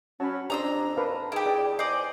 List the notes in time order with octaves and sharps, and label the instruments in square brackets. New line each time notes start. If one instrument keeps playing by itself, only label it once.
[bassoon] F#3 [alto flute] C#4 [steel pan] A5 B5
[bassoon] F2 [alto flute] D4 [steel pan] G4 D5 C6 [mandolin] A#5 D#6 E6
[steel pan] A#4 B4 F5 [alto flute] A5
[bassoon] D#3 [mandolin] E4 G4 [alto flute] G#4
[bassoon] E2 [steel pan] D5
[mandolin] C5 D5 [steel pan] D#5 [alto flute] G#5